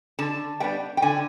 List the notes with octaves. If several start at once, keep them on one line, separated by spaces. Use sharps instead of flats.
D3 A5
G3 B3 D4 G5
G5
D3 G#5